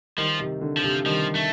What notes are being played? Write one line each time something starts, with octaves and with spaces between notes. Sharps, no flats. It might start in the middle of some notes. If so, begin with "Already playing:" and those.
D#3 F3 G3
C3 D#3
D3
F3
C3
D#3 F3 G3
A3